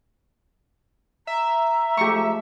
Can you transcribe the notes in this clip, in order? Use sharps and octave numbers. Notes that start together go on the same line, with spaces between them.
E5 A#5
F3 G#3 A3 G4 C#6